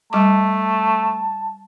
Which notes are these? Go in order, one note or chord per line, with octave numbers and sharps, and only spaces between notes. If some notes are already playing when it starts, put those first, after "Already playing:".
G3 A3 A5 D6